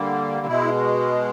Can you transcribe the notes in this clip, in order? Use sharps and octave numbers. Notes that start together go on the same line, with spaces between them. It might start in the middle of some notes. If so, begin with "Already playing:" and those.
Already playing: D3 G3 A#3
B2 G#3 E4